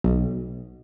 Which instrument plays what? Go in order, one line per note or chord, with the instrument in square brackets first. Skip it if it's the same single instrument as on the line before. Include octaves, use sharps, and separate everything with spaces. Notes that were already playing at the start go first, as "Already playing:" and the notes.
[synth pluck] B1